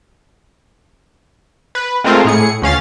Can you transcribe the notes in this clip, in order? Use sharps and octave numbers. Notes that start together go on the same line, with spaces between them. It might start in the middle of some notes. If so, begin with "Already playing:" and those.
B4
G#3 A3 C4 F4 A#4
A2 G#4 C#7
D2 C#4 F5 A6